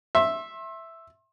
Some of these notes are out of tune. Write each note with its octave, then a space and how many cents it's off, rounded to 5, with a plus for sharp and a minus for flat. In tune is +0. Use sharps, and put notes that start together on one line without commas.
E5 +0 C6 +35